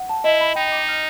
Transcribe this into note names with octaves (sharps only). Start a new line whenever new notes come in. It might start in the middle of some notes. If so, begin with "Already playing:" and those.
Already playing: F#5
A5
E4 D#5
B5
D#4 G5
D6
F6